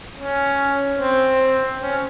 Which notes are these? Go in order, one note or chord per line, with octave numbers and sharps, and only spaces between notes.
C#4
C4
C#4